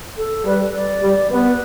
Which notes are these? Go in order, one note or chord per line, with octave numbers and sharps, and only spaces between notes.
A4
G3 B4
D5
G3
B3 B4